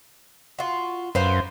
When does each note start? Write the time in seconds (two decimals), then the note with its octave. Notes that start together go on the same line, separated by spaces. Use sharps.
0.59 F4 F#4
1.15 F#2 B4 C5 F5